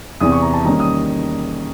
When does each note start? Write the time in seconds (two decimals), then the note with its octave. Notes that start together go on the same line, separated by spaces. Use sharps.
0.20 E2 C3 E3 D#6
0.32 C#6
0.42 A#5
0.54 A5
0.64 D#3 G3 A#3 C#4 A#5
0.80 D#6